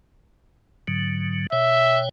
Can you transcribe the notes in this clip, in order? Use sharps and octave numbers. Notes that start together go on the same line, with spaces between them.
G#2 D3 F#3
B2 C#5 E5 G5